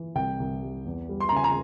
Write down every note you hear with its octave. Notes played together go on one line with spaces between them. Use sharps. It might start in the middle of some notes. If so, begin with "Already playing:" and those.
Already playing: E3
C2 G5
C2
G3
E2
G3
C6
A#5
C#3 G#5
A#5